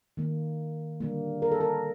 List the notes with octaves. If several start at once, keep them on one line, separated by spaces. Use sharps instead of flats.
D#3 A#3
D3 G3 A#3
A#4
A4
A#4